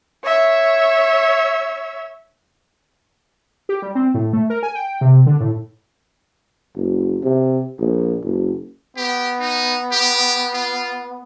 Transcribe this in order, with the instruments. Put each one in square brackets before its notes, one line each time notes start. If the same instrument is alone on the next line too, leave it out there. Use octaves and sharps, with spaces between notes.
[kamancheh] C#5 E5
[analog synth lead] G4
G3
C4
A2
A3
A#4
G#5
G5
C3
D3
A2
[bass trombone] F#1
C3
A#1
F#1
[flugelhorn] B3 [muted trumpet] G4
[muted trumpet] D#4
G4
F4